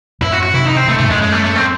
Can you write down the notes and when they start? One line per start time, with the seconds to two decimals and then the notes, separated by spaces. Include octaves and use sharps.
0.21 F#2 A2 E4
0.32 F#4
0.43 F#4
0.54 C3 D#3 E4
0.66 D#4
0.77 C4
0.87 C3 D#3 A3
0.99 G#2 C3 A3
1.10 F#2 A2 G#3
1.22 G#3
1.32 A3
1.44 A3
1.55 C4